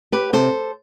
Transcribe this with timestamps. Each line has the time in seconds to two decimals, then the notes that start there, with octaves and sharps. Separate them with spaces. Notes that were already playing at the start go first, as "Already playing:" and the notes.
0.12 G4 B4
0.33 C3 A4 C5